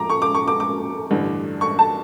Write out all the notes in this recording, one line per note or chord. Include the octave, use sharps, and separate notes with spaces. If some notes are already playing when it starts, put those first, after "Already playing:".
Already playing: F3 A#5 D6
C#6
D6
C#6
D6
D6
A1 G2 D3
C#6
A5